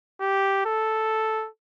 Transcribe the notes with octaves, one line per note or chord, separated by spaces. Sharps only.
G4
A4